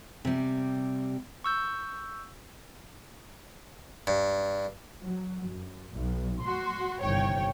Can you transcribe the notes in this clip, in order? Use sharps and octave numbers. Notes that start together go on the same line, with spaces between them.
C3 G3
C#6 E6 G6
G2
F#3
F#2
B1
F#4 C6
G1 C2 D#3 C#5 G5